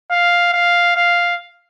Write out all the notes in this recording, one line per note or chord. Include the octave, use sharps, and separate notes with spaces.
F5
F5
F5